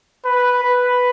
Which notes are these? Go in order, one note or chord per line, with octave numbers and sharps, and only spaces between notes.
B4
B4